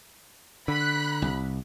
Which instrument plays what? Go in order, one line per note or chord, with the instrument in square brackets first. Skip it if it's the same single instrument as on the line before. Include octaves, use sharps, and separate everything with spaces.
[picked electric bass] D3 [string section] B5 F#6
[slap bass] C2